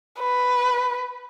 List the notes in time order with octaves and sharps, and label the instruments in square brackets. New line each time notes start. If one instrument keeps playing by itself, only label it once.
[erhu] B4